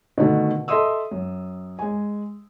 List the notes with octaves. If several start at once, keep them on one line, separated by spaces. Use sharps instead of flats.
B2 D3 D#3 A3 F#4
A4 D#5 E5 C6 D#6 E6
F#2
G#3 G#5